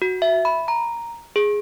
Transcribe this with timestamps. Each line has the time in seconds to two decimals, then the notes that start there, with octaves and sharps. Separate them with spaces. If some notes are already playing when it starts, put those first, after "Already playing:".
0.02 F#4
0.22 E5
0.45 B5
0.68 A#5
1.36 G#4